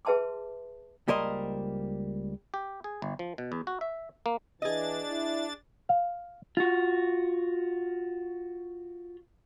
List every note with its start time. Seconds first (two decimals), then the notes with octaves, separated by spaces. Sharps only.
0.05 G#4 B4 E5 A5 C6 D6
1.08 C#2 G3 A#3 A#4 C5 D#5
2.54 G4
2.84 G#4
3.02 G1
3.19 F3
3.38 B2
3.52 E2
3.67 F#4
3.81 E5
4.26 A#3
4.62 E3 D4 G#4 D#5 A6
5.09 E4
5.89 F5
6.57 F4 F#4